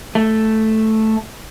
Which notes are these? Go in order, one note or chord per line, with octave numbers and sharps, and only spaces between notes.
A3